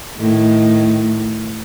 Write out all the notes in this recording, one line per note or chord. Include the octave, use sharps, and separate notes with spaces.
A2 D#3